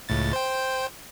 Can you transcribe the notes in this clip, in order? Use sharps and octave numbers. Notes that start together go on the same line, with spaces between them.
C#2 A2 A6
C5 G5